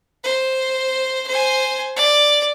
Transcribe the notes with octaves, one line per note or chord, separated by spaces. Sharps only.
C5
C5 G#5
D5